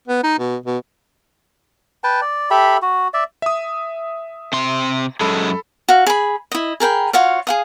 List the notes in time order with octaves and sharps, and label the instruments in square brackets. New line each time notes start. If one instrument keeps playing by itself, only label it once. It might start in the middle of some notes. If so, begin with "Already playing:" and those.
[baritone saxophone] B3
D#4
B2
B2
[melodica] B4 G5 A5
D5
G4 A4 E5 B5
F#4
D5 E5
[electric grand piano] E5 D#6
[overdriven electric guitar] C3 C6
[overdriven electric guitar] F#2 G#3 [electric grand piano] A4 B5
[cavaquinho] F#4 F5
G#4 B5
E4 D#5
G#4 A#4 G5 B5
F4 F#4 C#5 F5
G#4 F5 D#6